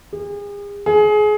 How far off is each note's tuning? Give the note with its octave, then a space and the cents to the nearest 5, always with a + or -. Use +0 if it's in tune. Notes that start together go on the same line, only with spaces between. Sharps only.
G#4 -40
G#4 +25